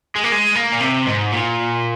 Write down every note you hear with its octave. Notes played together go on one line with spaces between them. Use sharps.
G#3
A#3
G#3
A#3
A#2
C3
G#2
A#2